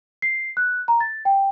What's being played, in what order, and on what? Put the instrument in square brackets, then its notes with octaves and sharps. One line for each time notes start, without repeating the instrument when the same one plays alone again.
[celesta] C7
F#6
A#5
A6
G5